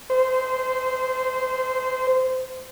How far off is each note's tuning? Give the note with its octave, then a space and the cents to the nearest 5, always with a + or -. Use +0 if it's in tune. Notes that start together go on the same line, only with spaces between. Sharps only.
C5 -20